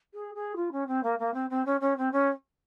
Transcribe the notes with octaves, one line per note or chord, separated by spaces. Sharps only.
G#4
G#4
F4
C#4
C4
A#3
A#3
C4
C4
C#4
C#4
C4
C#4